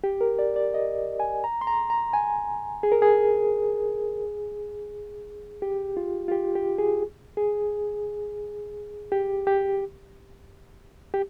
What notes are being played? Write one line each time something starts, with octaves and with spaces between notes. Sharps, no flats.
G4
A#4
D5
D5
D#5
G#5
A#5
C6
A#5
A#5
G#5
G#4
A#4
G#4
G4
F4
F4
G4
G4
G#4
G#4
G4
G4
G4